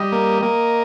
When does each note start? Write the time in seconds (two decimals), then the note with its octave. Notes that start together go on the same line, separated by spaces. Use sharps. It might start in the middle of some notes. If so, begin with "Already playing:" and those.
Already playing: G3 D#5
0.13 A#3
0.43 A#3